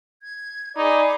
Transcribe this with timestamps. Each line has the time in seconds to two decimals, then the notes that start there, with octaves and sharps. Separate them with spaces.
0.22 G#6
0.77 D#4 G#4 D5 B5 D6